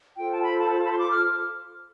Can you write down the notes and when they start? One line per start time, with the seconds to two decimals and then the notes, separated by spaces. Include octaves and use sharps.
0.16 F4 A4 C5 G5
0.31 A5
0.43 B5
0.58 A5
0.71 A5
0.84 B5
0.92 C6
0.98 D6
1.10 F6